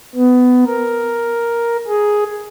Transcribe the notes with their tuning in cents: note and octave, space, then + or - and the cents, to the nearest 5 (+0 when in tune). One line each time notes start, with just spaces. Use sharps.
B3 +15
A#4 +5
G#4 +5